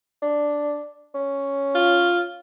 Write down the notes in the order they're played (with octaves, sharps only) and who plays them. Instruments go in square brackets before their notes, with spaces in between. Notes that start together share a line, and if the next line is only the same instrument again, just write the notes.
[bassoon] D4
C#4
[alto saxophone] F4